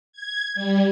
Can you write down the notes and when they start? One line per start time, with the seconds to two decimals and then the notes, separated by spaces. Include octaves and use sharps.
0.13 G#6
0.55 G3